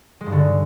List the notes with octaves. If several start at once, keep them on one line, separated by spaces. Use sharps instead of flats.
G#3
G2
D3